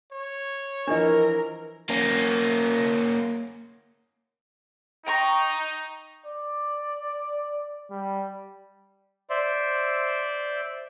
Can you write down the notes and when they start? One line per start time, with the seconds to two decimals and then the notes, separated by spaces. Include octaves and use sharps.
0.12 C#5
0.87 E3 F3 D4 A4 A#4 D#5
1.90 A#3 C#4
5.06 D#4 G5 A#5 C#6
6.26 D5
7.90 G3
9.30 C5 D5 E5 C6